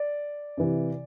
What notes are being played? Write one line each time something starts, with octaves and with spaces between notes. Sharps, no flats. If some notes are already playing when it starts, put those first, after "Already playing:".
Already playing: D5
C3 E3